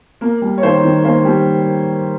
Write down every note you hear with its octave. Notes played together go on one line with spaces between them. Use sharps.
A#3
G3
C#5
D#3 C5
D#3
A#3 C5
G3